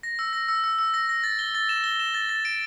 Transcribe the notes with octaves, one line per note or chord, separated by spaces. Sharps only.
A#6
E6
A#6
E6
E6
E6
A#6
A#6
A6
G7
A6
E7
G7
E7
A6
A6
D7